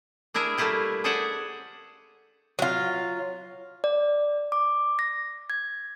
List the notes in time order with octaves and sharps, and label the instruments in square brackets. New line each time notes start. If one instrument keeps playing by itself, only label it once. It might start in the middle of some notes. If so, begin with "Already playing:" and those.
[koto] D4 E4 G#4 A#4 E5
G3 A3 A#3 E4 F4 G4
G#4 A4 C5 D5 E5 F#5
[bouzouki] F#3 F4
[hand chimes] D5
D6
A#6
G#6